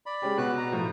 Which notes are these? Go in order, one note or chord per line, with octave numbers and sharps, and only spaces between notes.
D5 B5
G#3 C#4 G4
B2 F#4 B4 F#6
A#5
A2 F3